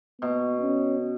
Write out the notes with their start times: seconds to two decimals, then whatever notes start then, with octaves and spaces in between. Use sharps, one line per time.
0.21 B2 B3
0.61 C#4